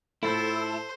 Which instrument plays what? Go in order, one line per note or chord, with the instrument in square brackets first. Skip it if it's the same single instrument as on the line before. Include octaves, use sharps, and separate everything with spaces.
[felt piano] A2 F4 A6 [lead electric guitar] E4 [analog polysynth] A4 [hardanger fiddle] C5